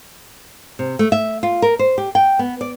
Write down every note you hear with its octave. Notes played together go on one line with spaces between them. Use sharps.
C3
A3
E5
F4
A#4
C5
G4
G5
B3
D5